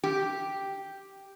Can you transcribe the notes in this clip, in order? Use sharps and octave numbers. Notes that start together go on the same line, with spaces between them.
G4